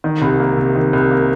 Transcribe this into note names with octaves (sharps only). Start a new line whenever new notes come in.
D#3
C2
A#3
C3
D#3
C2
A#3